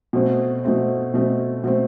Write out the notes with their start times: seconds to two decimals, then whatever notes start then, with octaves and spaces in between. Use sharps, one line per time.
0.13 B2 A3 C4
0.64 B2 A3 C4
1.14 B2 A3 C4
1.64 B2 A3 C4